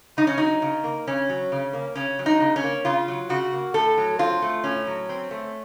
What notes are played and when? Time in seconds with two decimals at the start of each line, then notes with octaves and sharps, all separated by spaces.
0.17 C#3 D#4
0.27 C#4
0.38 F#3 D#4
0.62 C#3
0.84 A#3
1.07 C#3 C#4
1.29 F#3
1.52 C#3
1.73 A#3
1.95 C#3 C#4
2.19 F#3
2.26 D#4
2.40 C#3
2.56 C#4
2.63 A#3
2.85 C#3 F4
3.08 F#3
3.29 C#3 F#4
3.53 A#3
3.74 A2 A4
3.98 F#3
4.19 C4 F4
4.42 A3
4.64 A2 C#4
4.87 F#3
5.09 C4
5.31 A3